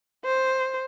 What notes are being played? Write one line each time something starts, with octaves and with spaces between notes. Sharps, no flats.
C5